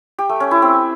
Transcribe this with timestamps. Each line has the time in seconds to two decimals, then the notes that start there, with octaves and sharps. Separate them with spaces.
0.18 G4
0.29 A3
0.40 C#4
0.51 E4
0.62 C4